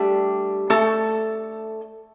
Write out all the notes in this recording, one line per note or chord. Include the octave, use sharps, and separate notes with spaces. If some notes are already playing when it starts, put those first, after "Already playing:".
Already playing: G3 A3 D4 G4
A3 A4